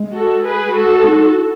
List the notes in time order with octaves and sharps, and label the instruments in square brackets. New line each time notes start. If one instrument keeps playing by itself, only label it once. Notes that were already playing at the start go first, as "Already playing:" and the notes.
Already playing: [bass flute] G#3
[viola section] F#4 A4
G#4 B4
[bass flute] G#3 [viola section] F#4 A4
[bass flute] D#4
E4